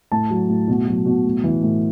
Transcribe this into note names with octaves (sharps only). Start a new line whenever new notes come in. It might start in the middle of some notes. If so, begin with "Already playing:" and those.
A2 A5
F#3
A2
B2
F#3
B2
A2
E3
A2